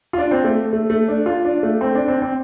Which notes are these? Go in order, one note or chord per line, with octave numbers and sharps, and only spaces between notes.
F4
D4
C4
A3
A3
A3
D4
F4
D4
A3
C4
D4
C4
C4